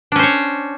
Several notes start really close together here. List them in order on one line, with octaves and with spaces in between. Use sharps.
D4 C#4 C5 C#5